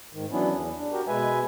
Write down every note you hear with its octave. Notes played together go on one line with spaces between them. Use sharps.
G#2 D#3
E3 F#3 B3 C#4 D4 E4
E2
D4
F#4 G4 A#4
B2 G#3 B4 E5 G#5